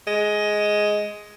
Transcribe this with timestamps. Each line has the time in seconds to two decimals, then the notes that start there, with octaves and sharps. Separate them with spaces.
0.07 G#3